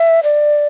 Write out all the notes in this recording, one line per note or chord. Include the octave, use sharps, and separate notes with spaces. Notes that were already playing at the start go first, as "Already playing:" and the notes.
Already playing: E5
D5